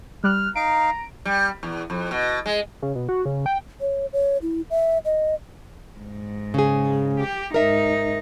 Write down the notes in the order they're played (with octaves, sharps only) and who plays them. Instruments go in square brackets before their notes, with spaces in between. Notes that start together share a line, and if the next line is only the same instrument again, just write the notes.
[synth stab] G3 F#6 [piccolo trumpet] F6
[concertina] D#4 F5 [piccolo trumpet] A#5 [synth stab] D7
[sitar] G3
E2
F2
B2
G#3
[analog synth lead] C#3
B2
F#4
C#3
G5
[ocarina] C#5
C#5
E4
E5
D#5
[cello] G#2
[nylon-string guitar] C#3 G#4
[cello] G4
[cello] G#2 D#4 [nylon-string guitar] A#4 E5